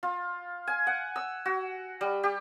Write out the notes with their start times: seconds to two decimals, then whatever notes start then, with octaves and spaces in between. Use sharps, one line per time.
0.03 F4
0.67 G#5
0.87 F#5
1.16 E6
1.45 F#4
2.01 G3
2.23 G4